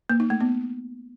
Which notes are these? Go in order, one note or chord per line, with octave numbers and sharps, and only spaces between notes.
A#3
D#4
A3
B3